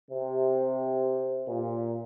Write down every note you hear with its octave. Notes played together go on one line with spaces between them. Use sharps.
C3
A#2